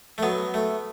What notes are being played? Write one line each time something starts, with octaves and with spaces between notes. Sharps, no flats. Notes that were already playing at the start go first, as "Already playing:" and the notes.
A3
F#3 B3
A3